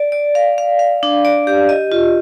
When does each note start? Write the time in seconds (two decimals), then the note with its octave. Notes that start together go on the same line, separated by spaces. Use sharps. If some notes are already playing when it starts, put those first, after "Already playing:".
Already playing: D5
0.12 D5
0.35 F5
0.58 F5
0.79 F5
1.03 D4
1.25 D5
1.47 G4
1.69 D#5
1.92 F4